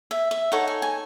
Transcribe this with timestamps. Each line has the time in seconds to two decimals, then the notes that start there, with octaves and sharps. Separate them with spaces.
0.11 E5
0.31 E5
0.52 D#4 A4 C#5 F#5
0.67 G#5
0.82 G#5